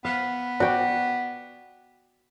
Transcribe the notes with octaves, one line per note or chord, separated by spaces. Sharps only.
B3 F5
F#4 D5 G5